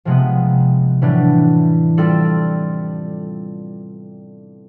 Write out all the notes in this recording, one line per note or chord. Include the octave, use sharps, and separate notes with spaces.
C3 F3 G#3 B3
A2 E3 G3 B3 D4
G3 C4 F4 A4 D5